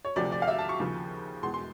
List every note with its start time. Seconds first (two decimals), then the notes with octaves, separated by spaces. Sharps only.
0.05 C#5
0.16 D2 C3 F3 D5
0.32 D5
0.42 F5
0.48 E5
0.58 A5
0.69 C#6
0.80 D#2 C#3 F3
1.43 E2 B2 G#3 C6
1.54 C6